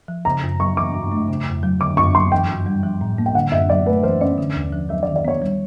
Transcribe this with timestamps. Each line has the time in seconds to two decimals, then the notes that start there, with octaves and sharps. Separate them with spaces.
0.08 F3
0.25 C#3 A#5
0.43 F#2
0.60 F#3 C#6
0.77 E3 D6
0.94 G2
1.12 A3
1.28 C#3
1.45 F2
1.63 F#3
1.80 D3 D6
1.97 F#2 C#6
2.15 F#3 C6
2.32 E3 G5
2.48 G2
2.66 G3
2.83 F3
3.01 A2
3.18 A#3
3.26 G5
3.35 D3 F#5
3.52 F#2 E5
3.69 F#3 D5
3.87 A3 B4
4.03 E3 C5
4.21 C#4 D5
4.38 D3
4.55 D#2
4.73 F3
4.89 F#3 E5
5.03 D#3 D5
5.16 D5
5.25 B3 C#5
5.42 G3